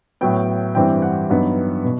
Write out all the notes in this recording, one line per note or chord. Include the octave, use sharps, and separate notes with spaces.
A2 F#3 B3 G5
G2 E3 G3 C4 E4 G5
F#5
G2 F#3 B3 D#4
B2